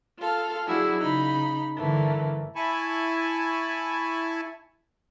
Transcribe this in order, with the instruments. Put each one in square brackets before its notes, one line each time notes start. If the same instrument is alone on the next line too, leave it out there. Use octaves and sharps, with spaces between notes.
[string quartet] F4 A4 F5
F#3 D4 E4 F#4 G#4
C#3 D#4 B5
G2 D3 E3 A3 A#3
[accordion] E4 G#5 A5 B5 C#6